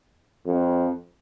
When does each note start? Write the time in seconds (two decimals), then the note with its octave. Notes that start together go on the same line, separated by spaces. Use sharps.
0.46 F2